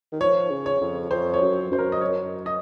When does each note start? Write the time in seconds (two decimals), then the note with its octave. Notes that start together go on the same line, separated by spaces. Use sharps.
0.12 D#3
0.21 F3 C#5
0.51 C#3
0.66 C#5
0.81 F2
1.10 F2 C5
1.34 C#5
1.42 F#2
1.72 F#2 C5
1.79 A#4
1.92 D#5
2.01 C#5
2.46 D#5